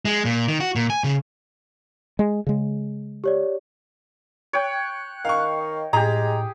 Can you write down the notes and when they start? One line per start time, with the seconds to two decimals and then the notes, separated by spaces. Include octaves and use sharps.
0.05 G#3
0.25 A#2
0.48 D#3
0.60 F#4
0.75 A#2
0.90 G#5
1.04 C#3
2.19 G#3
2.47 C#3 G#3
3.24 G4 C#5 D5
4.53 C#5 G5 F#6
5.25 D#3 F5 C#6
5.60 D#5
5.93 A2 G#3 G4 G#4 A#5